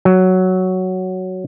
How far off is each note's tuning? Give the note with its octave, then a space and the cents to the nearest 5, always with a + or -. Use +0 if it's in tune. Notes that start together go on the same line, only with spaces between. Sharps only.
F#3 +5